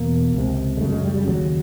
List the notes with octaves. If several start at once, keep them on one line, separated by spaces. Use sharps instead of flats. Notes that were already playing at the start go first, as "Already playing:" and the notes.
Already playing: E2 B2 A#3
C#2 C3
G#3
F#2 C#3 A3
G#3
G3
G3
D#2 C#3 F#3